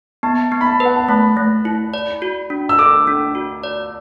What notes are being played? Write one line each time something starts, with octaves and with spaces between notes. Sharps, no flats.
B3 A5
B3
B5
A5
B4
F#5
A5
A3 B5
A3
E4
D5
F#4
D4
E6
A4 D6
D4
F#4
D5